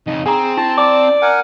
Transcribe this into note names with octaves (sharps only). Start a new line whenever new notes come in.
F2 C#3 D#4
C4 G#4 G#5 A#5
E4 A5
D5 A5 D6
A#4 F#5 G#5